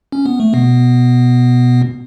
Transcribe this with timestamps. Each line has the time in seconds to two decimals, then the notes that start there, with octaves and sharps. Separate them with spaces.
0.12 C#4
0.26 B3
0.40 A3
0.53 B2 B3